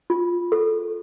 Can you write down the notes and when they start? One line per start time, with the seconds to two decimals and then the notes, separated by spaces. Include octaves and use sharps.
0.10 F4
0.52 A4